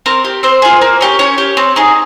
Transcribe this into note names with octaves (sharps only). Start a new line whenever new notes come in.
C4 A#4
G4
C4 C5
F4 G#4
A#3
C#4 G4
C#4 C#5
G4
C4
D#4 G#4